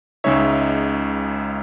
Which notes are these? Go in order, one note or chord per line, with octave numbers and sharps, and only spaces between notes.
C#2 C#3 G#3 D#4 C#5 E5